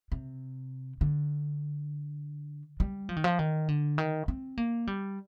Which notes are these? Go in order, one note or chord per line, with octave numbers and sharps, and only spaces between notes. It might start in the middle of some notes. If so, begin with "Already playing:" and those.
C3
D3
G3
F3
D#3
F3
D#3
D3
D#3
C4
A#3
G3